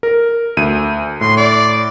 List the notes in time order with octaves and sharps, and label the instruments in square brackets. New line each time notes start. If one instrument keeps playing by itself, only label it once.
[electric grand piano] A#4
D2 D#7
[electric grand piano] A2 [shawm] C6
[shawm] D5